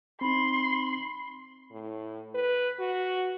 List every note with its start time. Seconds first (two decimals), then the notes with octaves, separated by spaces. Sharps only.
0.21 C4 D#4 B5 C6
1.71 A2
2.35 B4
2.79 F#4